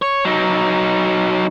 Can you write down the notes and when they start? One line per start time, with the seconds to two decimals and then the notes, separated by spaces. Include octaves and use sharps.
0.02 C#5
0.25 F#3 D#4